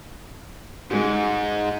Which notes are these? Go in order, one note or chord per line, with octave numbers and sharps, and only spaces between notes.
G#2 G#3 F#4